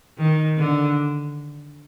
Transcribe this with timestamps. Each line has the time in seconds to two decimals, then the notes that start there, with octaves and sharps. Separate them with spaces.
0.18 D#3
0.58 D3